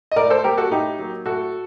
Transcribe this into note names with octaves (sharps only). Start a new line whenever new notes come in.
D#5
A2 A#4 D5
A4 C5
G3 A#3 G4 A#4
F#4 A4
A2 D#4 G4
F#3 A#3
A2 F#4 A4